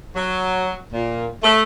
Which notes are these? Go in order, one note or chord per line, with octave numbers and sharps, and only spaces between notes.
F#3
A#2
A3